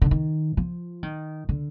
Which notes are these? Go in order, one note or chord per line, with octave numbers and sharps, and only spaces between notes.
D3
D#3
F3
D#3
D3